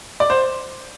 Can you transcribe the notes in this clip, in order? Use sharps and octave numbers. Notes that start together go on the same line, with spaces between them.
D5
C5